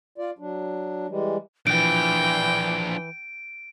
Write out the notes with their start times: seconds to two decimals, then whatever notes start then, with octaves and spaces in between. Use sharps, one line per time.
0.18 F4 D5
0.39 F#3 D4
1.09 E3 G3 G#3
1.67 E3 F3 D4 G5 D7